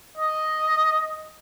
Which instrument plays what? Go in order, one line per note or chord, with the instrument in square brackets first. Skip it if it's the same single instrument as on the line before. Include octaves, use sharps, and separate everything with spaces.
[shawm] D#5